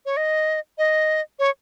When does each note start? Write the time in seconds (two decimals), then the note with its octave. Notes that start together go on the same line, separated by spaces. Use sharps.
0.06 C#5
0.17 D#5
0.78 D#5
1.39 C#5